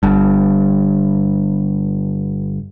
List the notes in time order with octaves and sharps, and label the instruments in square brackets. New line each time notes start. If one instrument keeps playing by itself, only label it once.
[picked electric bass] G1 G2